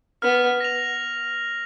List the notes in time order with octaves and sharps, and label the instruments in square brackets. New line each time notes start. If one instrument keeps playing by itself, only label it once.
[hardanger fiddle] B3 [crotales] F6
[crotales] A#6 F7